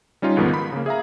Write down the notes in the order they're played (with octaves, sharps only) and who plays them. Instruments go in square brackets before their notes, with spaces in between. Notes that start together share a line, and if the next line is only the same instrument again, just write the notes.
[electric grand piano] G3 C#4 D#4 F4
C#2 G#2 D#3 F3 B3
B5
C#3 A#3
G#4 E5 F5 A#5